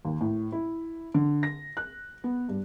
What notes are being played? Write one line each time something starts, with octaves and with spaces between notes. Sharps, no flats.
D#2
A2
E4
D3
A#6
F#6
B3
G2